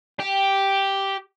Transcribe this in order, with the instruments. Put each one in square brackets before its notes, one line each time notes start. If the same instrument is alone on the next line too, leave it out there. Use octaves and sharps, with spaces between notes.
[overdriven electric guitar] G4